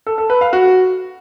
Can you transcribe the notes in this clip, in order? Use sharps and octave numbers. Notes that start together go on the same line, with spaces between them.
A4
A4
B4
F5
F#4